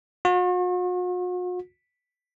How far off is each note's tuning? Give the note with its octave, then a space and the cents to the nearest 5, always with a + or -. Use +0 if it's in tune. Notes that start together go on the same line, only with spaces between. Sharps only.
F#4 -45